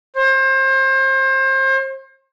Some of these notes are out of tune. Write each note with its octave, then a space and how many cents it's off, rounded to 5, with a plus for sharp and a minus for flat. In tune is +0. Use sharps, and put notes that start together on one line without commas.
C5 +30